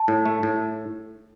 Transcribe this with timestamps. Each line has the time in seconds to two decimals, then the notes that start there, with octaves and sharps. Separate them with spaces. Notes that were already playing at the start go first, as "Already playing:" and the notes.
Already playing: A5
0.08 A2
0.26 A3
0.43 A2